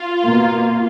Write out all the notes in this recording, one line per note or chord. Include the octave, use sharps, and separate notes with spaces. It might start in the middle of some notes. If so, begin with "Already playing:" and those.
Already playing: F4
B2 A#3